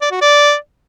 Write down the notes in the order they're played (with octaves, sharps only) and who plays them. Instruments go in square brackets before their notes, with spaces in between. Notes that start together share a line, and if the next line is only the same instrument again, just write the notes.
[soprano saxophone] D5
F#4
D5